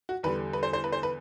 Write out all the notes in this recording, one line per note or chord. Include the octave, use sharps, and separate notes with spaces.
F#4
E2 D3 G3 B4
B4
C5
C5
B4
C5
B4